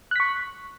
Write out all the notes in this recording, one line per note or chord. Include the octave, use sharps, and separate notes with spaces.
C#6 F#6 B6